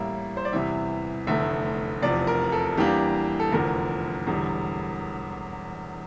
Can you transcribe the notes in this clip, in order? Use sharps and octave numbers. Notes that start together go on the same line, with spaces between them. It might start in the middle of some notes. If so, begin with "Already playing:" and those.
Already playing: A1 A2 G3 A#3 E5
C5
D5
E2 C3 E3 G3 E5
F1 E2 D3 A3 E5
F1 E2 C3 F3 D5
A#4
A4
E2 E3 G3 A#3 D4 G4
A4
F1 E2 D3 F3 A#4
E1 E2 D3 G3